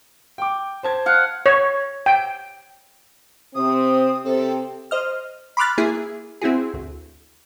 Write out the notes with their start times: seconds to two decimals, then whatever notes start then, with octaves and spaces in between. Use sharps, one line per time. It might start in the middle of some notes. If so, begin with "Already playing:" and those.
0.38 G5 D6
0.83 C5 A5 G#6
1.06 F5 F#5
1.46 C#5
2.06 G5
3.55 C3 C4 D#6
4.24 C3 C4 A4
4.91 C5 D#5 F6
5.57 B5 C6 D6 F6 F#6 A6
5.78 A#3 E4 G#4
6.42 C4 E4 F#4 G#4
6.74 D2